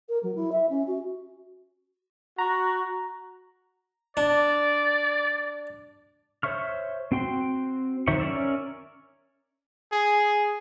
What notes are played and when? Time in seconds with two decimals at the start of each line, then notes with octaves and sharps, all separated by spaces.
0.09 A#4
0.23 F#3
0.35 E4
0.52 E5
0.69 C#4
0.87 F#4
2.38 F#4 A#5
4.17 D4 D5
6.43 C5 C#5 E5 C#6 F6
7.12 C4 F#4 G5 C6
8.08 D#3 F#3 C5 E5 C#6
8.20 C#4 A#4 C#5 D5 E5
9.92 G#4